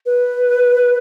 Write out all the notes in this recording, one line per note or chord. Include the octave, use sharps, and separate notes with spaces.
B4